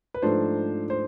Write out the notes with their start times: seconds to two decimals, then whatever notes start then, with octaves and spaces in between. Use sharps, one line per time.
0.14 B4
0.22 G#2 F3 A3 D4 C5
0.90 C5